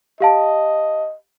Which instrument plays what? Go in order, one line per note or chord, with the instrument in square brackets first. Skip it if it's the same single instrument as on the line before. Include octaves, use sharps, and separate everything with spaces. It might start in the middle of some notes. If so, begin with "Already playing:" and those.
[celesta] G4 F5 A5 [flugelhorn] D#5